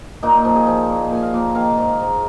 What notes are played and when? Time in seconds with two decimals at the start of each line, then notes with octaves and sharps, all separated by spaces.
0.23 A#2 D#4
0.45 F3
0.55 G#4
0.67 F3
0.89 A#2
1.12 A#2 G#5
1.22 F5
1.34 A#2
1.55 D#3 F5
1.78 G#2
2.01 G#2